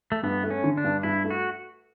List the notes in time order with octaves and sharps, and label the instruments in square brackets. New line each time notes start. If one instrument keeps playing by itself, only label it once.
[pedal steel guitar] A3
[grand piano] G2 [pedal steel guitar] B3
[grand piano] A3
[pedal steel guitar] C#4
[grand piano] D3
[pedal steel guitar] D4
[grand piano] G2
[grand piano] G2 [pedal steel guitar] E4
[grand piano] A3
[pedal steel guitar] F#4